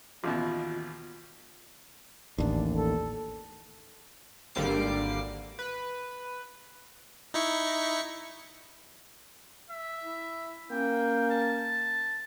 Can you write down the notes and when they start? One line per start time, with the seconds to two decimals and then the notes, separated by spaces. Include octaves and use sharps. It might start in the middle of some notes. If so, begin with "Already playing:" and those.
0.24 A1 D#2 B2 F4
2.38 A1 D#2 D4
2.76 A4
4.55 G#1 D3 G3 A#3 D6 C7
5.59 B4
7.34 D#4 E4 C#6
9.70 E5
10.04 E4
10.71 A#3 C#4 G5
11.30 A5